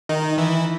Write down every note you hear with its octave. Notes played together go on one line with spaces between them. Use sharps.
D#3 D#4
E3 E4